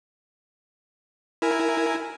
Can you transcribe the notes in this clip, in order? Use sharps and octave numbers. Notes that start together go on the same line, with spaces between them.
E4 A#4 G#5